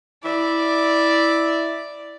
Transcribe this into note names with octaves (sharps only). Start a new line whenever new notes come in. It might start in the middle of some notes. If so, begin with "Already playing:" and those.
E4 D5